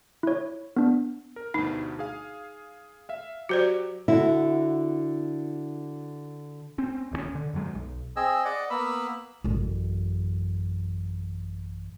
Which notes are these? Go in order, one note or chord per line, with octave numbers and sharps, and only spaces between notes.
E4 C#5
B3 D4
A#4
D2 G2 B2 D#4
G#4 F5
E5 F5
F#3 F#4 G4 C5 D5
D3 E4 F#4
C4 C#4
D1 D#2 F3 C#4
D3
F#2 D3 F#3 G#3
B1
C4 G#4 D#5 E6
D5 D#5 F#5
A#3 B3 B5 E6
A1 F#2